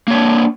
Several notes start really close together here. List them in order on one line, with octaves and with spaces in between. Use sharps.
A#3 C#5 D4